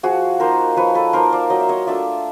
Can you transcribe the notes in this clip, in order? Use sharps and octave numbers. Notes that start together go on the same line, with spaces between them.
F3 F#4 G#4
A#3 D#4 A#4 C5
F3 B4 C#5
A4 B4
A#3 D#4 A#4 C5
C5 D5
F#3 D#5
E5
C#5 D#5
A3 D4 F4 D5 E5